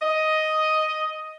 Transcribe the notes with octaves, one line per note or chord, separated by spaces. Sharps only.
D#5